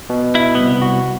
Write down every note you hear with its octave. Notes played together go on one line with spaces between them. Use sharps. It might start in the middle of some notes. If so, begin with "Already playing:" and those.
B2
E4
C2 G#2 B3
F#4